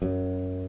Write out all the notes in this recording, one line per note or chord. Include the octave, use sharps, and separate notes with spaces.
F#2